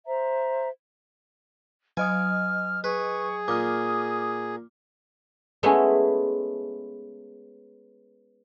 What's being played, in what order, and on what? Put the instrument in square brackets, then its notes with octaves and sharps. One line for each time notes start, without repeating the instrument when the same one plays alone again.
[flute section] C5 E5 A#5
[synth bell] F#3 D#5 D#6 [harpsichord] G#5 [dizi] F6
[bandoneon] G#4 [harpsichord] B4 [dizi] C#6
[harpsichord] A#2 [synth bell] D6 F6 [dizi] D#6
[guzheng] G#3 A3 B3 C#4 E4